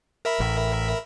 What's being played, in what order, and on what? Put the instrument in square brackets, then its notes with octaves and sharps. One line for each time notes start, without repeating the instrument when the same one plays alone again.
[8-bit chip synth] A#4 E5 B5
[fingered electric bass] A1